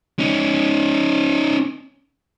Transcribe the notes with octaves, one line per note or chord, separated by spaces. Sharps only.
C#4 D#4